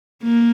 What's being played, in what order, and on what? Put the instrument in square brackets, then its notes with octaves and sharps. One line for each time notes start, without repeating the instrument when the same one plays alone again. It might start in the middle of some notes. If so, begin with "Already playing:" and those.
[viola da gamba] A#3